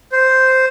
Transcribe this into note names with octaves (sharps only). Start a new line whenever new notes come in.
C5